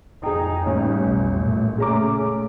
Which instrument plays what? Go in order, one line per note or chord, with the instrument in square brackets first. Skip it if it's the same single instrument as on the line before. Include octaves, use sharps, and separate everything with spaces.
[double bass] F2 D#4 [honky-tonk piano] G#4 G5
[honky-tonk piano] A1 [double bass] G3 C#4
[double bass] B1 F2
A#2 A3
[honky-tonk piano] C#3 A#5 D6 [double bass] A3 C#4